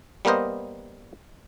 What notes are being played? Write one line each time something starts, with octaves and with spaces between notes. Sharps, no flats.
G3 A#3 B3 A#4 C5 D#5